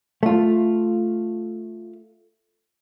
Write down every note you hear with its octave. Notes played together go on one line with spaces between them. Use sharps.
A3 F4